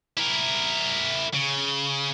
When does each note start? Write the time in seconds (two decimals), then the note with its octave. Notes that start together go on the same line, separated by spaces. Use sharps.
0.17 E4 A#4
1.33 C#3